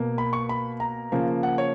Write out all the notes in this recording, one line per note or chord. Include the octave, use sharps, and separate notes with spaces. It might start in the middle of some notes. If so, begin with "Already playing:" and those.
Already playing: B2 A#3
B5
C#6
B5
A#5
C#3 F3 A#3
F#5
C#5